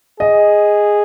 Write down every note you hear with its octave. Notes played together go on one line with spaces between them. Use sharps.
G#4 D#5